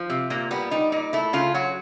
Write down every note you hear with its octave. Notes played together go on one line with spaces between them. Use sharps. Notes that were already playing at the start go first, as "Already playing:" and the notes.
Already playing: F3
C3
A#2 A#3
G3 B3
G3 D#4
A#2 D#4
A3 E4
C#3 F4
F#3 F#4